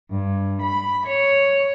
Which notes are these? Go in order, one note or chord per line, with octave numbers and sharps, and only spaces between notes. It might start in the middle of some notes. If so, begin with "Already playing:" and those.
G2
B5
C#5